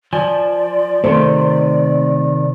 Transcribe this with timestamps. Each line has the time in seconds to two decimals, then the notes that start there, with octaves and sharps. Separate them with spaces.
0.13 F3 D5 G#5
1.04 C3 D#3 A3 C5